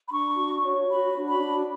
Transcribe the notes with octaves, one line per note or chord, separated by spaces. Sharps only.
B5
D4 C#6
F#4
C#5
F#4 B5
D4
B5
D4